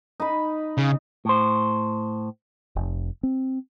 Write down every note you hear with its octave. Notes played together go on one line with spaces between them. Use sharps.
D#4 B5
C#3
A2 C5
F1
C4